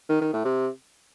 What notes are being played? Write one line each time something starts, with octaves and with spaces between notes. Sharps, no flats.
D#3
D#3
A2
C3